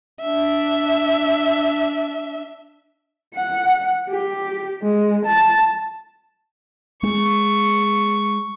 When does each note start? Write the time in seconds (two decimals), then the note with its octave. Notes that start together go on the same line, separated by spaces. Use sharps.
0.22 D4 E5
3.35 F#5
4.10 G4
4.82 G#3
5.26 A5
7.03 G#3 C#6